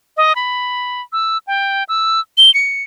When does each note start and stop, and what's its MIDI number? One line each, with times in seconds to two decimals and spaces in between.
0.17 0.33 75
0.36 1.02 83
1.13 1.38 88
1.47 1.84 79
1.89 2.20 88
2.38 2.53 103
2.54 2.83 97